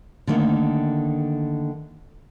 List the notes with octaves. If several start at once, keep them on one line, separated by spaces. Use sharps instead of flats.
D3 D#3 A3 A#3